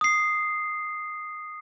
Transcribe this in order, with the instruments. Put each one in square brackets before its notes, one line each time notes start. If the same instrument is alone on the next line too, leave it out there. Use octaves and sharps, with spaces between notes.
[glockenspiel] D#6 C7